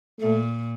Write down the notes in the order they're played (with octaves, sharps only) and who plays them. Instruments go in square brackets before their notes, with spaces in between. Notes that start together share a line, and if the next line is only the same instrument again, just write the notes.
[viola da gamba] A#2 [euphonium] A3